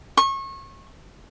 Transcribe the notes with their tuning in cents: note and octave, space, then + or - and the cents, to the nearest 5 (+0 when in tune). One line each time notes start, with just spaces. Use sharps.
C#6 -30